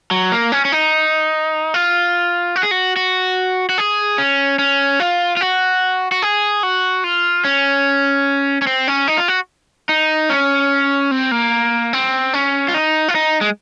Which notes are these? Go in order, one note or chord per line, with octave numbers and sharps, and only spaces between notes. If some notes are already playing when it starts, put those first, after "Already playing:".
F#3
A#3
C#4
C#4
D#4
F4
F#4
G#4
F#4
F#4
F#4
G#4
C#4
C#4
F4
F4
F#4
F#4
G#4
F#4
F4
C#4
C#4
C4
C#4
D#4
F4
F#4
D#4
C#4
C4
A#3
C4
C#4
F4
D#4
F4
D#4
G#3